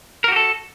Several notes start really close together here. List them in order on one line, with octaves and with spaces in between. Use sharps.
A#4 F#4 G4 A4